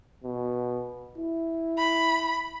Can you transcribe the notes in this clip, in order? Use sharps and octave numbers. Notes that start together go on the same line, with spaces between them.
B2
E4
B5